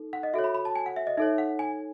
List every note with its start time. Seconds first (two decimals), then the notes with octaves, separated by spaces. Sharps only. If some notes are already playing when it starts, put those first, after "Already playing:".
Already playing: D#4 A4
0.13 F#5
0.23 D#5
0.34 F#4 A4 C#5 E5
0.44 B5
0.55 B5
0.65 A5
0.76 G#5
0.86 F#5
0.96 E5
1.07 D#5
1.17 D#4 A4 C#5 E5
1.38 F#5
1.59 G#5